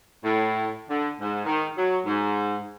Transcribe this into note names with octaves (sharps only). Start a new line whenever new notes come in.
A2
D3
G#2
D#3
F#3
G#2